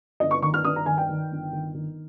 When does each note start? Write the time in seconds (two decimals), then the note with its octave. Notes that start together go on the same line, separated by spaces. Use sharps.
0.20 G1 D#5
0.31 C#6
0.42 D#3 C#6
0.54 F6
0.65 G2 D#6
0.76 A#5
0.86 D#3 G#5
0.98 G5
1.09 D#3
1.31 G1
1.53 D#3
1.74 D#3